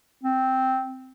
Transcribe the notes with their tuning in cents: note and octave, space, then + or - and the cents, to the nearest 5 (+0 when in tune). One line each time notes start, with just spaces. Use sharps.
C4 -5